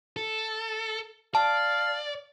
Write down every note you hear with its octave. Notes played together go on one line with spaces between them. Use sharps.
A4
D5 F5 A5